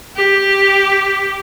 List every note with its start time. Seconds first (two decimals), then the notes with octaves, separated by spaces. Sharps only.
0.16 G4